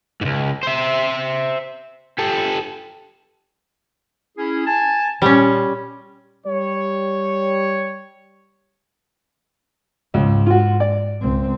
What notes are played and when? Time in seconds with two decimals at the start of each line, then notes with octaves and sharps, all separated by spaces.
0.21 C#2 G#2
0.63 C5 E5
2.19 G4 A4
4.37 C#4 E4 G#4
4.66 G#5 A5
5.22 A#2 G3 C#4
6.46 G3 C#5
10.14 C#2 G#2
10.46 F4 F#4
10.80 D5
11.22 C#2 C4